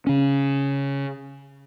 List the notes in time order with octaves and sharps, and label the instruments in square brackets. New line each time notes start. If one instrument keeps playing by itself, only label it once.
[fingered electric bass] C#3 C#4